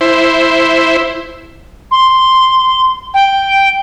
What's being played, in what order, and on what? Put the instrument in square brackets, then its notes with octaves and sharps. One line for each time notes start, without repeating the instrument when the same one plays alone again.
[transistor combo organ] E4 C5
[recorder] C6
G5